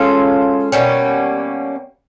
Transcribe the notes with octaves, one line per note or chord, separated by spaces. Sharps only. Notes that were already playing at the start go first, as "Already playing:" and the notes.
Already playing: G#3 C#4 F4 A4
B2 G3 A#3 C#4